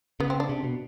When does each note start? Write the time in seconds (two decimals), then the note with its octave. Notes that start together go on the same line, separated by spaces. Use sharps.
0.20 C#3 B3
0.30 C4
0.40 D4
0.49 C3
0.64 B2